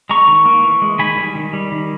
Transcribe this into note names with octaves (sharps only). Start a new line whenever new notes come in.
G#3 A#5 C#6
D#3
A#3
E3
G#3
D#3 G#5 B5
G3
D#3
G3
D#3